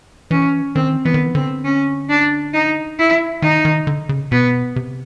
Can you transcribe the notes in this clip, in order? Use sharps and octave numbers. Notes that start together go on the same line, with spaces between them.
E3 C#4
D#3 C4
E3 B3
D#3
E3
D3 C4
C#4
D4
D#4
E4
D#3 D#4
D#3
D3
C#3
B2 B3
C3